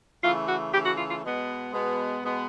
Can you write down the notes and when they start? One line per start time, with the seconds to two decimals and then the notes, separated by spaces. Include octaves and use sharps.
0.23 C#3 E3 A3 F4
0.48 F#4
0.73 C#3 E3 A3 G4
0.85 F#4
0.98 F4
1.10 F4
1.23 B2 G#3 B3
1.73 B2 G#3 B3
2.23 B2 G#3 B3